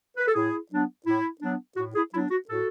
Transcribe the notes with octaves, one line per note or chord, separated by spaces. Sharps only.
B4
A4
A2 E4 G#4
F#3 B3 D4
A2 E4
F#3 B3 D4
A2 F#4
E4 G#4
F#3 B3 D4 E4
F#4
A2 F#4 A4